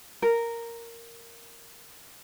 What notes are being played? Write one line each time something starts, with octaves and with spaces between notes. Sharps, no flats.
A#4